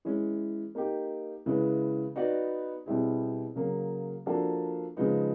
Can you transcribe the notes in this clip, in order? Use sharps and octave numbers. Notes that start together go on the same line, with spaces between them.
E3 G#3 C#4
A#3 D#4 G4
C#3 E3 G#3 B3
B3 D#4 F#4 B4 D5
B2 G3 C4 E4 G#4
C#3 F#3 A#3
F3 A#3 D4 F#4 A4
C#3 F3 G#3 B3 D#4